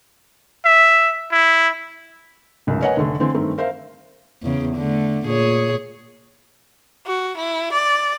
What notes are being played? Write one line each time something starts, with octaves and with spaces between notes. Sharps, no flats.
E5
E4
F1 C#2 F#2
A#4 B4 C#5 D#5 F#5 G#5
F1 D3 A3
D3 E3 C4
G2 D#3 A3 C4
A#4 C5 E5 F5
E2 C#3
D3 A3
A#2 G#4 C#5
F#4
E4
D5